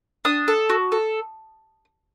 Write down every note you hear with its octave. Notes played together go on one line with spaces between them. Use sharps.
D4 D#6
A4
F#4
A4